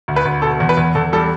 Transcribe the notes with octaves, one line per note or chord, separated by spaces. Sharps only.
D2
B4
D2
B2 A4
E2
B4
E2
E2 A4
G3 A4